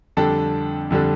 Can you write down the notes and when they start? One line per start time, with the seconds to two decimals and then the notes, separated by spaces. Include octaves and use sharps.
0.17 F2 D3 G3 D4 A4
0.90 F2 D3 G3 D4 A4